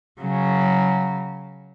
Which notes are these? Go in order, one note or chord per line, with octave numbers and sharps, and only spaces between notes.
C#3 F#3